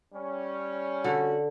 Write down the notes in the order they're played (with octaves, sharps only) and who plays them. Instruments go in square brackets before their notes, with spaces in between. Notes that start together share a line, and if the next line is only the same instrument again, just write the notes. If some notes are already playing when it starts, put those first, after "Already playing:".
[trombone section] G3 C#4
[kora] D3 [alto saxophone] F#4